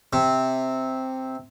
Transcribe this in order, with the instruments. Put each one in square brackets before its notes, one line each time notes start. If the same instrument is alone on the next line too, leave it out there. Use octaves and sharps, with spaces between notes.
[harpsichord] C3